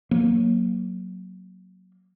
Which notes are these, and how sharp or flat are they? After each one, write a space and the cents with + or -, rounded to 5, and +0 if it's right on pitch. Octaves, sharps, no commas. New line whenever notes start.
F#3 +0 A#3 +0